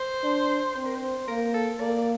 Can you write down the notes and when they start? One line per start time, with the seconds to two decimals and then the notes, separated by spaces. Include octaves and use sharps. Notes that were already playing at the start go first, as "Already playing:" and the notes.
Already playing: C5
0.24 D4
0.76 C4 C5
0.86 A#4
0.96 C5
1.28 A#3 A#4
1.54 A4
1.80 A#3 D5